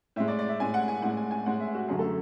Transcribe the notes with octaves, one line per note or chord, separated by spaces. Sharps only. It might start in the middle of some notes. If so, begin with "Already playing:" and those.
A2 G#3 E5
D5
D5
E5
A2 G#3 G#5
F#5
G#5
A2 G#3 F#5
G#5
G#5
A2 G#3 F#5
E5
F#4
F#2 D3 F#3 A3 G#4
A4